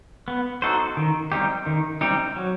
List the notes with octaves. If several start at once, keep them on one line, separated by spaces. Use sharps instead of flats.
B3
D#4 F#4 A4 C5
D#3
G3 C4 D#4 G4
D#3
G3 C4 D#4 G4
F#3